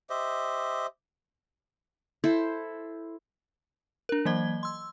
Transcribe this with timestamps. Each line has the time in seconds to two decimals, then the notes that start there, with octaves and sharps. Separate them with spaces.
0.10 G4 C5 D#5 E5
2.24 E4 A4 C5
4.09 D4 A#4
4.25 E3 F#3 A#3 D#5 G#6 G7
4.63 C6 E6